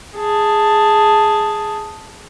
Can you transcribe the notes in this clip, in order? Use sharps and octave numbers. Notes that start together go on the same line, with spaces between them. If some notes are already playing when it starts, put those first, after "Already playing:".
G#4 A5